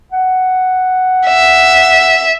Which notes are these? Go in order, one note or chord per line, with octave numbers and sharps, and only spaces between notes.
F#5
E5